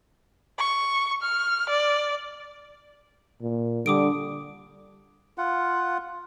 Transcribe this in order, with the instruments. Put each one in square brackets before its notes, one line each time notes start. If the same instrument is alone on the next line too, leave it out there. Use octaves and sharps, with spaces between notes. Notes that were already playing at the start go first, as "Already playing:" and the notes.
[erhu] C#6
F6
D5
[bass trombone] A#2
[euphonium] D3 [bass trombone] G3 [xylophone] D6 D#6 D7
[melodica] F4 F#5